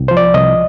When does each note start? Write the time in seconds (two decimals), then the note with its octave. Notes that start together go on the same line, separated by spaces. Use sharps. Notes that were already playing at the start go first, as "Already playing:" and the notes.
Already playing: C2
0.08 F3 C5
0.17 D5
0.34 C2 D#5